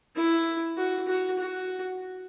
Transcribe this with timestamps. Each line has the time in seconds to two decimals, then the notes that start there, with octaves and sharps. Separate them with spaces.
0.16 E4
0.77 F#4
1.08 F#4
1.38 F#4